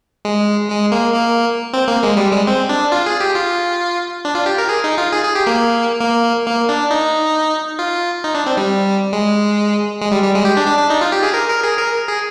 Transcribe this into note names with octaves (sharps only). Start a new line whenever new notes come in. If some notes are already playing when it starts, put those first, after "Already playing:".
G#3
G#3
A#3
A#3
C4
A#3
G#3
G3
G#3
C4
D4
F4
G#4
G4
F4
D4
F4
G4
A#4
G#4
D#4
F4
G#4
G#4
G4
A#3
A#3
A#3
D4
D#4
F4
D#4
D4
C4
G3
G#3
G#3
G3
G3
G#3
G4
D4
D4
D4
D#4
F4
G4
G#4
A#4
A#4
G#4
A#4
G#4